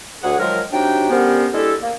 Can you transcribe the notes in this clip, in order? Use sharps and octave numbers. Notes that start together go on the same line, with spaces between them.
D2 G#4 C#5 F#5
D#3 F3 F#3 G#3 F4 A#4
C3 F#3 D4 D#4 G4 G5
D3 G3 B3 C#4 A#4 C5
G#3 D4 E4 G4 A4
A#3